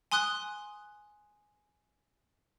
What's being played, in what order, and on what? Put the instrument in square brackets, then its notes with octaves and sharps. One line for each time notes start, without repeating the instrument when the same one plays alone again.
[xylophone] G#5 C6 D#6 F#6 G7